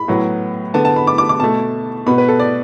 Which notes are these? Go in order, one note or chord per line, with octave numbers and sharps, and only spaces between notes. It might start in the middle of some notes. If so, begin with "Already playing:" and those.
Already playing: B5
A2 F#3 B3
D3 B3 A5
A5
B5
D6
D6
D6
B2 A3 A5
B2 B3 B5
B4
A4
D5